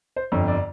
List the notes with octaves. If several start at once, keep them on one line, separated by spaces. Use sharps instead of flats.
C5
G1 F2 D3 C#5
D5